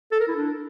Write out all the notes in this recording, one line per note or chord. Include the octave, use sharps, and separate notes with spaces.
A4
A#4
E4
D4